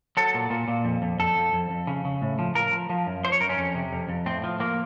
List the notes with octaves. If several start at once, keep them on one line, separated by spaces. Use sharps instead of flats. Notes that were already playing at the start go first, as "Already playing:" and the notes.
F#3 A4
A#2
A#2
A#2
F2
F2
F2 A4
F2
F2
F2
C#3
C#3
A2
F3
F3 A#4
F3
F3
F#2
F3 C5
C#5
F#2 A#4
C#4
F2
C3
F2
F2
A2 C4
F3
F3 A#3